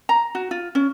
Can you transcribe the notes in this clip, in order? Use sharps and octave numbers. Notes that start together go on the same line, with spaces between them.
A#5
F#4
F4
C#4